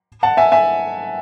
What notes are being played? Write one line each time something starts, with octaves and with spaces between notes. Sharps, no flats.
F#5 A5
E5 G#5
E5 G#5